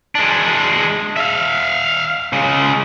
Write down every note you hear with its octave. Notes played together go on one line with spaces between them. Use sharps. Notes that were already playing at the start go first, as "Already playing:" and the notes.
G#3 D4
E5 F5
C#3 G#3